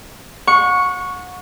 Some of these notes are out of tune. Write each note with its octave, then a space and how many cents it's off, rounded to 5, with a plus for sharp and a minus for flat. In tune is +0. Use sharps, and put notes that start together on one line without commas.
F#5 -35 C#6 +0